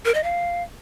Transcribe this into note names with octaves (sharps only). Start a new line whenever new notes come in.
A#4
D#5
F5